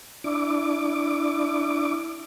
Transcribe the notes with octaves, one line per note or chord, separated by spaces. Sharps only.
D4 E4 D6